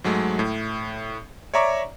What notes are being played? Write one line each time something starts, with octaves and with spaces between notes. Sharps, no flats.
G#2 F#3 G#3 A3
A2
C#5 D5 E5 A#5 C#6 D6